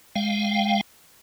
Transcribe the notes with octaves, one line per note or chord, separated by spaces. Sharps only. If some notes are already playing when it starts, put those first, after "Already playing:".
G#3 F5 G5